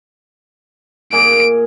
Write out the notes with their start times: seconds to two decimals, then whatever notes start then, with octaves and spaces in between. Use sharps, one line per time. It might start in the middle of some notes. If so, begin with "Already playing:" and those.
1.13 A#2 G#4 D7